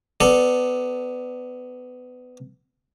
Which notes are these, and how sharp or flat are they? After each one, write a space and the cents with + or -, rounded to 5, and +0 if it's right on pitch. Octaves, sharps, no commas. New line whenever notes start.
B3 +25 A4 +0 D5 +10